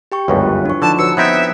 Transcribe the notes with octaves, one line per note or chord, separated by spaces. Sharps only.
G4 G5 C#6
G1 C#2 F#2 F4 B4
D4 E4 C#6
D3 F3 D#4 A5
F#4 B4 C#5 E6 C#7
B3 C4 D#4 E5 F#6 G#6 D7